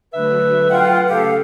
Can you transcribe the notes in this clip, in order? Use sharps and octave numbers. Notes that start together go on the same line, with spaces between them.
D3 F#3 A3 B4 E5
F4 F#5 G5
C#3 A3 G4 A4 F5